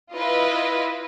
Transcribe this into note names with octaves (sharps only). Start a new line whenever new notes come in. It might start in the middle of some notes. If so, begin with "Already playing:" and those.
E4 F4 B4 D#5